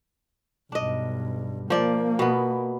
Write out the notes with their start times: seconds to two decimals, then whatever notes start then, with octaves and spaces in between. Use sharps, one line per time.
0.72 B1 G2 D4 D#5
1.70 F3 A#3 D5
2.19 B2 B3